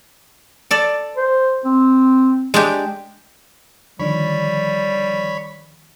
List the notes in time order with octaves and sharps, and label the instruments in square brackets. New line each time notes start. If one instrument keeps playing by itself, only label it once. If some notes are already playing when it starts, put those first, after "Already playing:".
[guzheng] A4 D5
[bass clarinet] C5
C4
[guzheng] G#3 D4 G4
[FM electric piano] D3 D#3 F3 [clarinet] G3 [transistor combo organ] C#5 B5